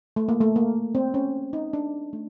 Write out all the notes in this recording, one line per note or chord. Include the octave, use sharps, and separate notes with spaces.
A3
A#3
A3
A#3
C4
C#4
D#4
D4
A3